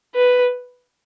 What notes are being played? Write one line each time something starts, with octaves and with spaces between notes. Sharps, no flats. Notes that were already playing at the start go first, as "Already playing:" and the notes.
B4